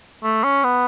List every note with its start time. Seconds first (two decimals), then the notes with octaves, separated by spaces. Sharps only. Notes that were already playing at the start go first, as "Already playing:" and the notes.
0.23 A3
0.44 C#4
0.64 B3